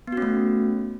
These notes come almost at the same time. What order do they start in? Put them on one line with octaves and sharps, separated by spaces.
B3 F#4 C#4 A3